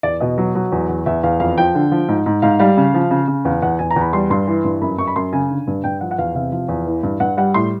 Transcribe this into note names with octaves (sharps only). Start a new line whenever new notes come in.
E2 D5
B2 D#5
F#3
F#3
E2
E2
E2 E5
E2 F5
F2 F5
F3 G5
D3
F3
G#2
G#2
G#2 F5
G3 F5
C#3
F3
C#3
C#3
E2 F5
E2 F#5
E2 G#5
A#5
E2
B5
G3 C6
G2 C6
E3
G2
F#2 B5
F#2 C#6
B5
F#2 C6
C#3 G#5
D3
G2
G2 G5
F3 F#5
F#5
E2 F5
C3 F5
F3
E2
E3
G2
G2 F#5
G3 F#5
A2 C6